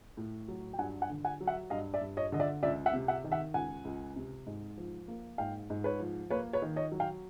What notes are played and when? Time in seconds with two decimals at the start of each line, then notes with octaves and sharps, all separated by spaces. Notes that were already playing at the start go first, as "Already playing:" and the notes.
0.17 A2
0.48 F#3
0.73 G5
0.78 G2 F#5 G#5
1.02 F#5 G#5
1.10 D3
1.25 F#5 G#5
1.41 F#3
1.47 E5 F#5
1.70 G2 D#5 F5
1.94 D5 E5
2.01 G2
2.17 C#5 D#5
2.32 D3 D#5
2.40 D5 E5
2.63 C#2 D5 E5
2.86 E5 F#5
2.93 C3
3.08 E5 F#5
3.24 D#3
3.32 E5 F#5
3.54 C#2 F#5 G#5
3.85 C#2
4.16 C3
4.47 G#2
4.78 F3
5.08 A#3
5.38 G#2 F5 G5
5.70 G#2
5.84 B4 C#5
6.00 F3
6.30 A#3 B4 C#5
6.53 B4 C#5
6.62 D#3
6.76 C#5 D#5
6.92 F#3
7.00 F5 G5